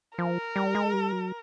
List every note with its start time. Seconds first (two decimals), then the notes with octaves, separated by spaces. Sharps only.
0.18 F3 A#4
0.56 G3
0.75 G#3
0.93 G3
1.12 F#3